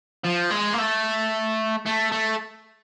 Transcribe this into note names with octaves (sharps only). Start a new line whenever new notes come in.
F3
G#3
A#3
A3
A3
A3